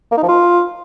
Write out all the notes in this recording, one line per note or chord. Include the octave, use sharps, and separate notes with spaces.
A#3
D#4
F3
F4